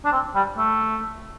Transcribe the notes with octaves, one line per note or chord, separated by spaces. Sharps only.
D4
C4
G3
A3